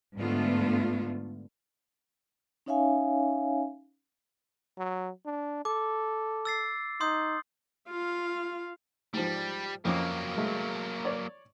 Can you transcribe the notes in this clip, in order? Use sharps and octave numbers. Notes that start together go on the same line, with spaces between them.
G#2 D3 A3 B3 F4
C#4 D#4 C#5 E5 F5 G#5
F#3
D4
A4 D6
E6 A6 C7
D#4 C6 D#6 G6
F4 F5
G#2 F3 G3
F2 F#3 A#3 C#4 D6
G#3 A3
C#5 D5